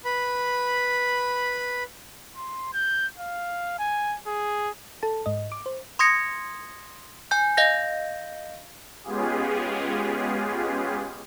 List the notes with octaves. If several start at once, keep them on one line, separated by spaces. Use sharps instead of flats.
B4 B5
C6
G6
F5
G#5
G#4
A4 A5
G#2 D#5
D6
C5
C6 D#6 G#6 A#6 C#7
G#5 G6
D#5 F5 G6 A#6
G#3 B3 C#4 F4 G4 G#4